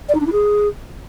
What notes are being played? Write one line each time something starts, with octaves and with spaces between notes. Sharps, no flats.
D5
D#4
D4
E4
G#4